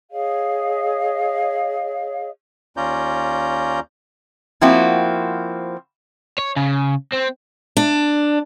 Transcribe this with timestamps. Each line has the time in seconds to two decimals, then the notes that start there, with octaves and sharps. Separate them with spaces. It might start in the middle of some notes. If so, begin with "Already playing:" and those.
0.11 G#4 C#5 D#5 F5
2.77 D#2 C#4 F4 D5 A#5 G6
4.61 F3 A#3 C4 E4 F#4
6.39 C#5
6.56 C#3
7.12 C4
7.77 D4